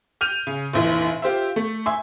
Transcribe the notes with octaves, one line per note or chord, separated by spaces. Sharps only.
F6 G6 D#7 F7
C#3
F1 A#1 E3
F4 G4 C5 E5
A3
E5 G#5 C6